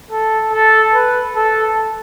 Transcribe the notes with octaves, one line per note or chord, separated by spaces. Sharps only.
A4
A4
B4
A4